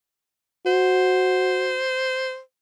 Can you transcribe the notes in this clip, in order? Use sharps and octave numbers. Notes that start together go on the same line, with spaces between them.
F#4 C5